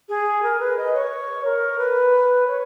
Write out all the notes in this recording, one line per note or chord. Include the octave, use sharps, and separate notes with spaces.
G#4
A#4
B4
D#5
C#5
A#4
B4
C#5